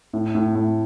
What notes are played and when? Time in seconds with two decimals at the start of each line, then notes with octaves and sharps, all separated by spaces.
0.13 A2
0.35 A2
0.55 A2